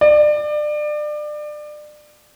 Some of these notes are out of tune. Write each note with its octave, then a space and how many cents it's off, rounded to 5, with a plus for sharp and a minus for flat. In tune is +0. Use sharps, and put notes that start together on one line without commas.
D5 +30